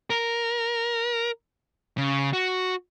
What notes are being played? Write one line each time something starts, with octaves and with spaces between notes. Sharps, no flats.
A#4
C#3
F#4